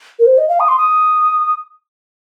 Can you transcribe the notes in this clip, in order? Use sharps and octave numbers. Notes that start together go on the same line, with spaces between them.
A#4
C5
D#5
F5
D#6
C6
D#6